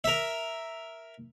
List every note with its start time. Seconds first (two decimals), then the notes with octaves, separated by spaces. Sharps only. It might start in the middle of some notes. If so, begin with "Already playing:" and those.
0.04 A#4 E5